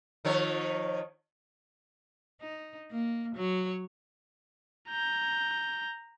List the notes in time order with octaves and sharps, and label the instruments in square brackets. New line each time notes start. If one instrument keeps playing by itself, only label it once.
[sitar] D#3 F3 C#5
[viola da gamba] D#4
A#3
F#3 C#5
[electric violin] A#5 G6